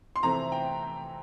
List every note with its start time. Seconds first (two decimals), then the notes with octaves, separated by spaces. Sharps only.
0.16 C6
0.23 C3 E3 A3 C4 A#5
0.52 G5